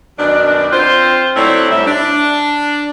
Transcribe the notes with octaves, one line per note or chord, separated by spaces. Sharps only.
F#2 B2 D#3 D4
C4 F4 C5
F#3 A3 C4 D4 E4 C#5
A2 G3 E5
D4